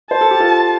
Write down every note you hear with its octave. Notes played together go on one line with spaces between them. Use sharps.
C5 A5
A4
G4
F4 A4